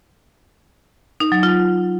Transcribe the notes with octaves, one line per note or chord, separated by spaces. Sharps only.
D#4
F#3
F4